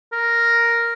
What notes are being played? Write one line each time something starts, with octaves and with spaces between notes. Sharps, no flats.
A#4